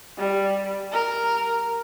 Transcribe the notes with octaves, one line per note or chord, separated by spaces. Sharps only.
G3
A#4